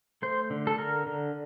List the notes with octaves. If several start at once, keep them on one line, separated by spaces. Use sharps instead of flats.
A3 C5
D3
A4
D3 A#4
D3